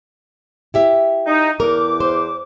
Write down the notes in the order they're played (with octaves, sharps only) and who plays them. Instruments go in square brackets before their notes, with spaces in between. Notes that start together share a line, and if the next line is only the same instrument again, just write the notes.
[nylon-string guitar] E4 G4 E5
[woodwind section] D#4
[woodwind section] E2 D6 [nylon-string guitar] A#4
[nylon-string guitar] C5